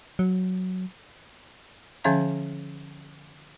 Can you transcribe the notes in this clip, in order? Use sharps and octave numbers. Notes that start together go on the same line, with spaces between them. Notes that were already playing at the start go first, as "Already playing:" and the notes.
F#3
D3 F3 C#4 E5 F5 A#5